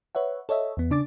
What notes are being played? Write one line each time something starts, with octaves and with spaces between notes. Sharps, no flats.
B4 C#5 E5 F#5
A4 C#5 D#5 E5
E2 B3
C#3 D4 D6 A6